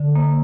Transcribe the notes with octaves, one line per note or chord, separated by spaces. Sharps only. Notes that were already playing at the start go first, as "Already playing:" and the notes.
Already playing: D3
A#3